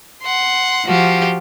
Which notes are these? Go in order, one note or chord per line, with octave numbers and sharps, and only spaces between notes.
F#5 C6
F3 F#4 G4